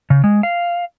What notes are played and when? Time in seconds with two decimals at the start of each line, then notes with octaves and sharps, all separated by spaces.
0.10 C#3
0.24 G#3
0.43 F5